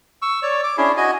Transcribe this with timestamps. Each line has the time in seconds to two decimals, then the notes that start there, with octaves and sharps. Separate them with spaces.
0.22 C#6 E6
0.43 C#5 D5
0.64 D6
0.78 C#4 D4 E4 G#4
0.97 F#4 D#5 G#5